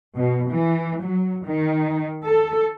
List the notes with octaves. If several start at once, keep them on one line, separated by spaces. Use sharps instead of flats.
B2
E3
F#3
D#3
A4